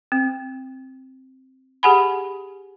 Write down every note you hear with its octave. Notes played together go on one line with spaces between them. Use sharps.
C4
G4 G#4 F#5 G#5 B5